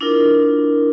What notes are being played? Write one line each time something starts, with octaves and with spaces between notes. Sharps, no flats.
D4 E4 F4 A#4